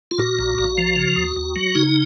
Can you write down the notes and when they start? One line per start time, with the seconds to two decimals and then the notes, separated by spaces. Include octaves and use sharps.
0.11 F4
0.18 A#2 F#4
0.39 A#1
0.58 A#1
0.78 F3
0.96 C#3
1.16 D#2
1.36 D#2
1.56 F#3
1.75 C#3 D#4